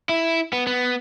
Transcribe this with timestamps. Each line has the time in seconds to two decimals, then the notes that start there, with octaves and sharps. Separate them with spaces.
0.09 E4
0.53 B3
0.67 B3